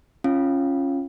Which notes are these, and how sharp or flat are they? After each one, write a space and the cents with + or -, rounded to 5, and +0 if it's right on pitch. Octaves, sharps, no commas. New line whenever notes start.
C#4 -15 F4 -15 F5 +0